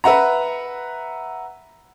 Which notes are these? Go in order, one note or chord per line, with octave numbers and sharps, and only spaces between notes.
B4 E5 F#5 A#5